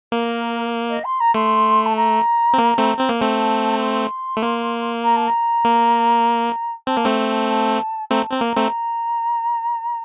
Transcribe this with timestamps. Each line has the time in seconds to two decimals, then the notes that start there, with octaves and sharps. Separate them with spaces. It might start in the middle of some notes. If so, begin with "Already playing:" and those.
0.12 A#3 A#4
0.89 D#5
1.04 C6
1.20 A#5
1.34 A3 C6
1.85 A5
1.96 A#5
2.53 C4
2.58 A#3
2.78 A3 C4
2.99 C4
3.09 A#3
3.20 A3 C4 A5
3.80 C6
4.37 A3
4.43 A#3
5.03 A#5
5.16 A5
5.27 A#5
5.65 A#3
6.87 C4 A5
6.97 A#3
7.06 A3 C4
7.28 A5
7.49 A5
8.10 A3 C4 A#5
8.23 A5
8.32 C4
8.37 A#3 A#5
8.56 A3 C4